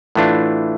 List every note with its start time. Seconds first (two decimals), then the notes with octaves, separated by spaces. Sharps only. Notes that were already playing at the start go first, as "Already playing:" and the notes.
0.15 A2 E3 A3 D4 F4